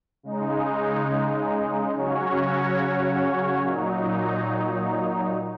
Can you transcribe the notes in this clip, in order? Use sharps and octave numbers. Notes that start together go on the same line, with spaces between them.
C#3 G#3 D#4
C#3 F#3 C#4 F#4 C#5
A#2 F#3 D#4